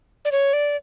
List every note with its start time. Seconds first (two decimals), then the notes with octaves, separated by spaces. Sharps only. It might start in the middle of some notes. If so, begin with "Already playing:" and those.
0.25 D5
0.32 C#5
0.53 D5